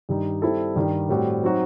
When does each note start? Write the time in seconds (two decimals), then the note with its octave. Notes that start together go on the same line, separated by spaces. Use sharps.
0.09 G2 D#3 G3 D#4
0.42 G3 C4 E4 A4
0.76 G2 D#3 G3
1.09 A2 G3 C4 F#4 C5
1.44 F#3 C4 D#4 F#4